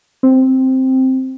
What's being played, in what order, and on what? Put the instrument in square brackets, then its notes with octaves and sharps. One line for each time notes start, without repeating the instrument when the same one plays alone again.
[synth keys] C4